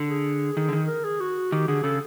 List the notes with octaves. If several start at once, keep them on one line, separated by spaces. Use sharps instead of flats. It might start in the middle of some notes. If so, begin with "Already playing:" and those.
Already playing: D3
G#4
D#3
D3
D#3
A#4
G#4
F#4
D#3 G4
D3 G#4
C#3 A4